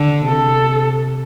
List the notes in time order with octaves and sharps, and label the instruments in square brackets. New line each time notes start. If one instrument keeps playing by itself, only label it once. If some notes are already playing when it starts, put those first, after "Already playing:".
Already playing: [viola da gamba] D3
[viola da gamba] C3 [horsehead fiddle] A4